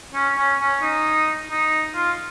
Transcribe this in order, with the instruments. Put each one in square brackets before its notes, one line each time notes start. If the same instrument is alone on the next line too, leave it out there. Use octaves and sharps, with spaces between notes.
[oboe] C#4
C#4
C#4
D#4
D#4
F4